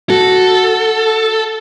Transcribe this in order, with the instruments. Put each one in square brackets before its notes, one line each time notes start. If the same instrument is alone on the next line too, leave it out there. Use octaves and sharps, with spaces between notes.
[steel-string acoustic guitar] F#4 [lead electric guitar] A4